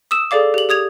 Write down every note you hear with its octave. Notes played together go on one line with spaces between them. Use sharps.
D#6 E6 E7
G#4 A4 D5 F5 D6
G4 F#7
G4 D#6 G#6 F7